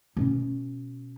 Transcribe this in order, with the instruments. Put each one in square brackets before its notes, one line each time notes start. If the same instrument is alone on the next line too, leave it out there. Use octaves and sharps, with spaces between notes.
[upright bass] B2 C#4